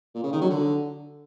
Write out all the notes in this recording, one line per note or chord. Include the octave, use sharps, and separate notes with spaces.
A#2
C#3
D#3
F#3
D3